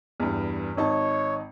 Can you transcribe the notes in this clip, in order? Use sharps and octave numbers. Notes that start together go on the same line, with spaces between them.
E2 G2
G#1 D#4 C#5 A5